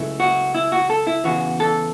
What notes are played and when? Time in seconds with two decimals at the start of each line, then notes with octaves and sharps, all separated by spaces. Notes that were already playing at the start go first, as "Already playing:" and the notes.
Already playing: C#2 C#3 F#3 A3 E4
0.20 F#4
0.54 E4
0.72 F#4
0.90 A4
1.07 E4
1.24 E2 C#3 E3 F#4
1.60 A4